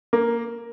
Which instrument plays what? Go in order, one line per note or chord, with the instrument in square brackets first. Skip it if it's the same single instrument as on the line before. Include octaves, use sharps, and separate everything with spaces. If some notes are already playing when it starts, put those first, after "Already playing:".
[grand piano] A#3